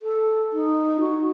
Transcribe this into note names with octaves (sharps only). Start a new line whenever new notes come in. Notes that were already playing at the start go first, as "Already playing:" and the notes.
A4
D#4
F#4